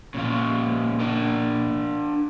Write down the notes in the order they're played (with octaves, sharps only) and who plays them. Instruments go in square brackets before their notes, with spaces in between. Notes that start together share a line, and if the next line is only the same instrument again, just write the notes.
[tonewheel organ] A#2 [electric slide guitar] C#3 F3 F4
[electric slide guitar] D4 A#4